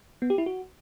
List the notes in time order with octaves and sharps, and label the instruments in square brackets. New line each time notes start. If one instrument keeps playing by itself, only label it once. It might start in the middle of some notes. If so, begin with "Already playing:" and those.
[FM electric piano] B3
G4
E4
F#4